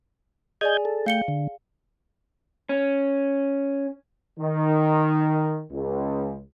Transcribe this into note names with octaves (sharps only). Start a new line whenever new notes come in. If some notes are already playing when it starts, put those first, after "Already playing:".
G#4 D5 D#5 G#5 G6 G#6
A4
A3 F5 G5 C#7 G7
D3
C#4
D#3
C#2